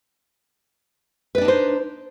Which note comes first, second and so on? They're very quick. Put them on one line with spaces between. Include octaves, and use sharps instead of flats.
B4 D5 D4 D#4 C5